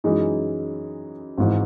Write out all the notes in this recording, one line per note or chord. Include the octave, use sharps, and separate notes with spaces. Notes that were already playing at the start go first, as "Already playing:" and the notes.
F#2 E3 G#3 D#4 G#4
G#1 G#2 E3